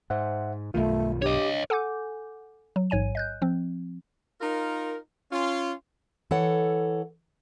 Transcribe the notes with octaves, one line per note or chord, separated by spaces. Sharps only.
G#2 C5 E5 F#5
B1 G2 D#3 A3 F4
D4 G4 C#5 D#5
A4 F#5 G#5 D6 G6
F#3
A1 G#2 C#5 G#5 D#7
D#5 F#6 G6
F3 C4
D#4 F4 A#4
C#4 F4
E3 A4 C#5 F#5